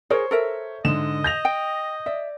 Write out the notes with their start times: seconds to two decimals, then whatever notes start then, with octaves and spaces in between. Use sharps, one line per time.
0.10 G#4 A#4 C5 C#5
0.31 A4 A#4 E5
0.84 G#2 D3 D#5 E7
1.24 G6 A#6 F7
1.45 G5
2.06 D5 E5